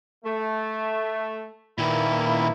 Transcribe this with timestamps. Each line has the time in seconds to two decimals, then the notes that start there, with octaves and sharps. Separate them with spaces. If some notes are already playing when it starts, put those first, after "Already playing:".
0.25 A3
1.78 A#2 D#3 A#3 B3 E4